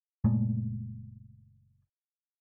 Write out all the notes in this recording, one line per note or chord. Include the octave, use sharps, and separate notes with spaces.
F#1 A#2 G#3 A3